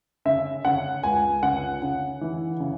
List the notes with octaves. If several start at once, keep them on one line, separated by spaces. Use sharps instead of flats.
C#3 E5
C#3 F#5
C#2 G#5
C#3 F#5
C#3
E3
C#3